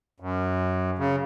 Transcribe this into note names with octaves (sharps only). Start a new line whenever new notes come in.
F#2
C#3